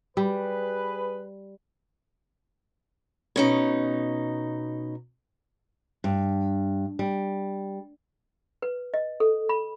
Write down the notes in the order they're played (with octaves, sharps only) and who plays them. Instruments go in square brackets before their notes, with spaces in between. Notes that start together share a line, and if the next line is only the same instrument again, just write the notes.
[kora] G3 [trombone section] G#4 B4
[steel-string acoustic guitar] B2 C#4 D#4
[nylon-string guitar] G2
G3
[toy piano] B4
D#5
A4
B5